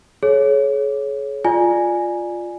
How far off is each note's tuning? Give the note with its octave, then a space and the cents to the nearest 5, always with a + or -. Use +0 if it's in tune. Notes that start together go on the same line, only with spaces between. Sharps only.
G#4 +40 C#5 +0
F4 +5 D5 +20 G#5 +0